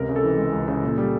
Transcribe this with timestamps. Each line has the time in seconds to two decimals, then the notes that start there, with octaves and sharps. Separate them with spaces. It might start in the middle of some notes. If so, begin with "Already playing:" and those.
Already playing: C#2 C3 A#4
0.09 C#3
0.16 A4
0.24 E3
0.38 G#3
0.53 C#2
0.68 C#3
0.83 A#2
0.98 G3